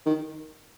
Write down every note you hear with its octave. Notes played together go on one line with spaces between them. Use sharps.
D#3